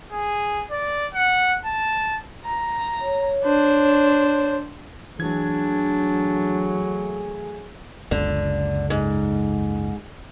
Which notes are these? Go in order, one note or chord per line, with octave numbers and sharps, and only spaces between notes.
G#4
D5
F#5
A5
A#5
C#5
D4 C5
E3 F#3 A3 D4 G#4 G#6
F#1 C#2 D3
G#2